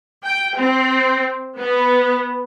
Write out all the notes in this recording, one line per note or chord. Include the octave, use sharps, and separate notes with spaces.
G5
C4
B3